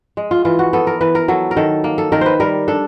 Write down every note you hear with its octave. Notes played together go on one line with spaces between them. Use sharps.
G#3
F4
E3 F4
F#4
B3 A4
A#4
E3 B4
A#4
F#3 A4
A#4
D#3 A4
A#3
A4
D#3 A#4
B4 C5
G3 A#4
D4 A4